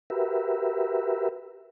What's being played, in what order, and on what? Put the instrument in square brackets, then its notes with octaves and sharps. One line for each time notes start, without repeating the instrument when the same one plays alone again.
[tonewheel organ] F#4 G4 A#4 B4 E5